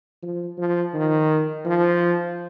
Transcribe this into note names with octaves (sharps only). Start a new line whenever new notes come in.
F3
F3
D#3
F3